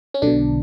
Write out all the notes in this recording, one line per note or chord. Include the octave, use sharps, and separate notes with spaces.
C#4
B1 B2 D3 D4